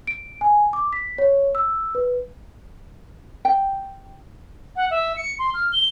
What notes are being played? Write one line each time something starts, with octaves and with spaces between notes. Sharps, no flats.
D7
G#5
D6
B6
C#5
E6
B4
G5
F#5
E5
C#7
C6
F6
G7